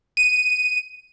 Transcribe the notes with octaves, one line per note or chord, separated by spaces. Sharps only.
D#7